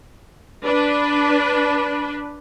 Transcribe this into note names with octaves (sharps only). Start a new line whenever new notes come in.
D4 B4